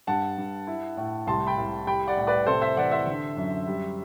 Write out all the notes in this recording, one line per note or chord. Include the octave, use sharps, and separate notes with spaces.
G2 F#5 A5
G2
E4
A2
C2 A5 C6
G5 B5
C2
G3 G5 B5
D5 F#5
A2
B4 D5
C3 A4 C5
C5 E5
E3 D5 F#5
C5 E5
D3
F#2
G3